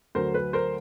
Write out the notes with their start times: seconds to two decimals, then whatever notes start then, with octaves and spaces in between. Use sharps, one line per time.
0.15 D2 D3 F#3 A#4 C5
0.34 B4
0.53 A#4 C5